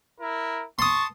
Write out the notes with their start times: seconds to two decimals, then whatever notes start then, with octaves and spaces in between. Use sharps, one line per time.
0.20 E4 A#4
0.79 A5 C6 C#6 D#6